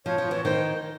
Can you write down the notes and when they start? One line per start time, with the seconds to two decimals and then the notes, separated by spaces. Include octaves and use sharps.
0.06 F3 C#5
0.18 F3
0.31 E3
0.44 D#3 C5